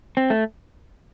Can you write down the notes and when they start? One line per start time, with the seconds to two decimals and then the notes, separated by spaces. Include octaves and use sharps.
0.17 C4
0.30 A3